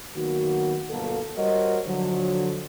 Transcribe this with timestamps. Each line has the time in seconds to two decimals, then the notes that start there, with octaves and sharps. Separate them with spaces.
0.15 D#3 F#3 A#3 B3 F#4
0.89 G1 B2 F#3 A#3 A4
1.37 G3 F#4 A#4 C5 C#5 D#5
1.87 D3 F3 F#3